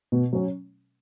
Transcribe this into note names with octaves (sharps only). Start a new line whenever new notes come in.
B2
F#3 C#4